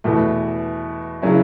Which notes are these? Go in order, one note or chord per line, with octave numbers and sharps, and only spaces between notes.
E2 B2 A3
C#3 F#3 C#4 E4